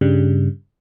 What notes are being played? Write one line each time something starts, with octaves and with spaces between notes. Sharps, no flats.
G2 C#3 G3